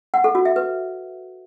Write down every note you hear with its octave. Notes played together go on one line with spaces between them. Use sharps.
F#5
A4
F#4
E5
B4